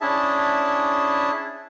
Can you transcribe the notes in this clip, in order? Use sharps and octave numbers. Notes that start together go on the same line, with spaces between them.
C#4 D4 E4 G#4 E5 A5